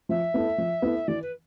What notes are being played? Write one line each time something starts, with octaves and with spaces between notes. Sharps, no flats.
F3 E5
B3 E4 A4
F3
B3 E4 A4
E3 D5
B4